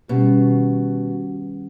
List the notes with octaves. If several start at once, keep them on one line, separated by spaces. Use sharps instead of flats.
B2 D#3 G3 C#4 G4